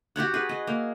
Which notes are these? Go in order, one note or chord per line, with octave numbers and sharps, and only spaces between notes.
F#4 G4 C#5 F#5
G#4 B4
D#5
A#3